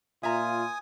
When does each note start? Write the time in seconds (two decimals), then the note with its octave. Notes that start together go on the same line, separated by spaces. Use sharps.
0.23 A#2 F4 E5 G#5 A#5 D#6